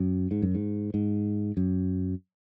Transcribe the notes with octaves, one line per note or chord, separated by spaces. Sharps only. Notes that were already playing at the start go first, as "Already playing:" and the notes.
Already playing: F#2
G#2
F#2
G#2
G#2
F#2